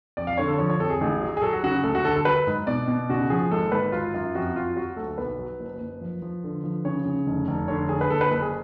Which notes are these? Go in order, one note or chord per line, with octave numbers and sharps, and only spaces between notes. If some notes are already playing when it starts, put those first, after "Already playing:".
F2 D5
F5
D3 C#5
A4
F3 C#5
C#5
F2 A4
G#4
A1
F#3
G#4
F#3 A4
F#4
C#3 F#4
D2 A4
F#4
D3 A4
A4
F#3 B4
G#2
B2 D5
B2
C#3 F#4
F3 G#4
G#1 A4
G#1 B4
F#3 F4
F#2 F4
F2 F#4
F2 F4
F#3 F#4
D2 A4
B1 B4
F#3
F#1
F#1
F3
F3
D3
F3
C#3 C#5
C#3
F1
F1
D3 C#5
D3 G#4
B4
F#1 A4
B4
F#1 A4
G#4